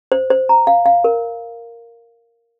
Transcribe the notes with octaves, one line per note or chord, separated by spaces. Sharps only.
C5
C5
A#5
F5
F5
A#4